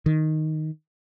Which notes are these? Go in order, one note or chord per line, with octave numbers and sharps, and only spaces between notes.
D#3